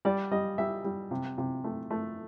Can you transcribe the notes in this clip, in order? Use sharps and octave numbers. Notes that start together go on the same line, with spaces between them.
G3 D5
G3 D#5
G3 E5
G3
C3
C3
A3
A3